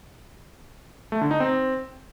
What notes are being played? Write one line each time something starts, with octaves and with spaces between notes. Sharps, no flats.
A3
D3
D#4
C4